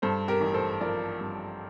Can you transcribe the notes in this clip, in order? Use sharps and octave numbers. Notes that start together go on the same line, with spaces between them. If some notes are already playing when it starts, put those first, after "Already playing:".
G2 A4 C5
G4 A#4
A1
A4 C5
F3 A#4 D5
G2